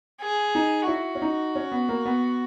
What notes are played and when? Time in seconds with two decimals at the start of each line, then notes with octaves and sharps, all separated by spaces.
0.21 G#4
0.55 D#4
0.88 E4 F#4
1.15 C#4
1.22 D#4
1.55 C#4
1.72 B3
1.89 A#3
2.05 B3